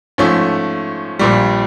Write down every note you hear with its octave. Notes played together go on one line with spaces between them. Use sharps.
G#2 F3 A3 C#4
A#1 A#2 G3